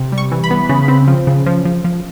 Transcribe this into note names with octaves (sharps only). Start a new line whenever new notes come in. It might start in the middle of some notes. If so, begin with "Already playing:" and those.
Already playing: C3
G3
C#6
E3
B5
B3
C#3
C4
F3
C#3
F3
F3
F3